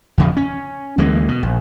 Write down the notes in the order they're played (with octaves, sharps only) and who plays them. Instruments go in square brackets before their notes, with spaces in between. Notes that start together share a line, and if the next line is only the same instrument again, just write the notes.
[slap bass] E2 C#3 F3
C#4
D2 E3 G#3 A#3
B2
A#1